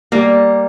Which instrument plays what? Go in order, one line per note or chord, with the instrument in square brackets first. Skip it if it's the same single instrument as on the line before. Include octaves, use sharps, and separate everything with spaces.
[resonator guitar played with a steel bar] G3 A#3